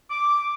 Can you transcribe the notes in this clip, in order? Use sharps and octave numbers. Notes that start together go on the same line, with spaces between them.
D6